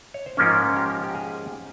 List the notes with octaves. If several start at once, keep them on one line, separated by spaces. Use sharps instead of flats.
C#5
C5
G#2 F3 A#3 C#4 A#4
G4
G4
G#4